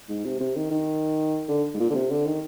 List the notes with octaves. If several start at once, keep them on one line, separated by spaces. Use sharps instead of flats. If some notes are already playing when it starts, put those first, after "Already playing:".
G#2
C3
C3
D#3
D#3
D3
G#2
A#2
D3
C3
D3
D#3